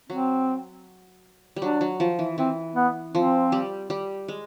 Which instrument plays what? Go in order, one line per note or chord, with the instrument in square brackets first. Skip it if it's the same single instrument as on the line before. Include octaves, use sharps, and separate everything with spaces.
[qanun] F#3 [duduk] C4
[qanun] G3
[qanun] F#3 [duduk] D4
[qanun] F#3
F3
E3
[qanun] E3 [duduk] C4
[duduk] B3
[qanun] F3 [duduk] C4
[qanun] G3
G3
G#3